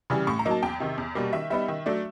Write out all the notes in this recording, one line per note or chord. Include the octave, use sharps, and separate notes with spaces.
C#3 E3 G3
A2 C#6
A#5
F#3 A#3 D#4
A5
E2 G5
C3 D#3
E2
B2 G3 A#3
D#3 E5
G3 B3 D#4 E5
D#3
F#3 A3 D4